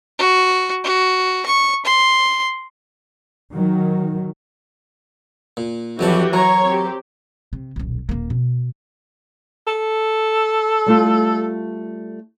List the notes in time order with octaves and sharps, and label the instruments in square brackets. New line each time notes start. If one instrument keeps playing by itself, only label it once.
[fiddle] F#4
F#4
C#6
C6
[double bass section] D#3 F#3
[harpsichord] A#2
[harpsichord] F2 F#3 A5 [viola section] E3 F#4 G4
[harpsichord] F#3 [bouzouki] A#4 A#5 [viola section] C#5
[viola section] C4 G4
[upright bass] C3
D#1 B1
D#1 A#3
B2
[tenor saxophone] A4
[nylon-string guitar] G3 A3 F4